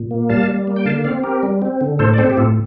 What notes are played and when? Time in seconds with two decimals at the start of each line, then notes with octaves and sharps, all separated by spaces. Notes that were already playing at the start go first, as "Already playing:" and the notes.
Already playing: A#2
0.11 A#3
0.29 G3 F5 A5
0.48 G3
0.67 A#3
0.76 G5
0.85 D3 F5 A5
1.04 C4 D5 F5
1.23 C4 G4 A#4
1.43 G3
1.62 C4
1.81 D3
1.99 A2 A4 C5
2.14 D5
2.18 C4 A4 C5
2.30 G4
2.37 A2 F4 A4